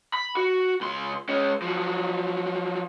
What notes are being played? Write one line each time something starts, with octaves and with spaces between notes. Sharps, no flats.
B5
F#4
C#2 C6
G#3 C#4
F3 F#3